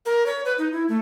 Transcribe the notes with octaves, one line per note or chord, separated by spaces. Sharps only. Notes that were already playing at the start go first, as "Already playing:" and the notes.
A#4
C#5
B4
D#4
E4
A3